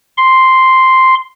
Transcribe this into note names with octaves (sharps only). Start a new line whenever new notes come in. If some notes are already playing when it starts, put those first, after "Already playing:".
C6